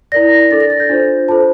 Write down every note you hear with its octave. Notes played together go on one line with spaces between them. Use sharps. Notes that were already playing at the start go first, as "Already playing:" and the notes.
E4 A#4 D5 A#6
A#6
D4 A4 D5 A6
A#6
A6
G6
D4 F4 C5
F4 A4 C5 A5